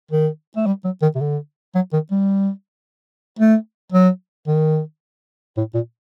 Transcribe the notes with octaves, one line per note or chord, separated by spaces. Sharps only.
D#3
A3
G3
F#3
D#3
C3
D3
F#3
D#3
G3
A3
F#3
D#3
A2
A#2